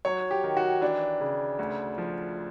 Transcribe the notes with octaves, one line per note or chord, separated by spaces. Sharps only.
F#3 C#5
G4
D#3
F#4
E3 D4
C#3
D2
F3